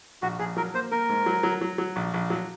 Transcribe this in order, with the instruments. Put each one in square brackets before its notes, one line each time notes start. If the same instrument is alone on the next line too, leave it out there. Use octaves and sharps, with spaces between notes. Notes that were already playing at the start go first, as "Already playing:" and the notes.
[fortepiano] A#1 [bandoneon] F#4
[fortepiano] A#1 [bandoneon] G#4
[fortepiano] F#3 [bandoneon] A#4
[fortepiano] A#3 [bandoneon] C5
[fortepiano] A#3 [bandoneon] A#4
[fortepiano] G#2
F#3
F#3
F#3
F#3
A#1
A#1
F#3